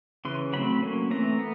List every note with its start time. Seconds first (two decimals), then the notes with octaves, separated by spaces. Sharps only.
0.25 C#3 E3 C6
0.53 F#3 A3 C4 B5
0.82 F#3 A#3 C#4
1.11 E3 A3 C4 A#5
1.39 B3